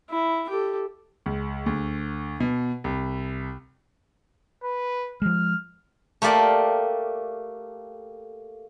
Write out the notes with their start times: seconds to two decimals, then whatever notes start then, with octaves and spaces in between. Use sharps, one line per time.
0.10 E4
0.50 G4 A4
1.26 C#2
1.66 D2
2.40 B2
2.84 C2
4.64 B4
5.22 F3 G#3 F6
6.22 A3 A#3 G4 D5 F5 G5